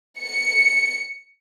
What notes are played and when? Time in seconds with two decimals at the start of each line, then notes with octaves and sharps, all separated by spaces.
0.20 C#7